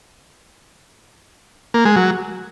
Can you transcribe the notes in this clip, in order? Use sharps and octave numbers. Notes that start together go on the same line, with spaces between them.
A#3
G#3
F#3